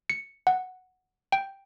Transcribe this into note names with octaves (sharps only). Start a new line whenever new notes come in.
C#7
F#5
G5